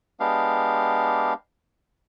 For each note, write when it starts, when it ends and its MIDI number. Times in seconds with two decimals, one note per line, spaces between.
0.20 1.33 56
0.20 1.33 59
0.20 1.33 62
0.20 1.33 67
0.20 1.33 77